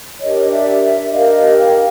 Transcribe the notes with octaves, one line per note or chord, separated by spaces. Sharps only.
D4 G4 A#4 C#5 D#5
D5 E5
D5 E5
D4 G4 A#4 D#5 F5
F5 G5